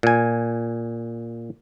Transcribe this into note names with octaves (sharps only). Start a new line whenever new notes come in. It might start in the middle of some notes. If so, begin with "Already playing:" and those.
A#2 G#5